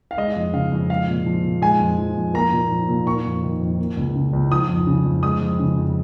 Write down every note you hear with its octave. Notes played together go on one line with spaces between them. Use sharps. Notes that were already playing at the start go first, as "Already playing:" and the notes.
F5
G#3 D#5
F2
C#3 F5
F2
G#3 F5
A#2
F3
A#2
G#3 G#5
F2
F3
F2
A#3 A#5
A#2
F3
A#2
A#3 C#6
F2
D#3
F2
A#3
C#2
C#3
C#2
F3 D#6
F2
C#3
F2
G#3 D#6
F2
C#3
F2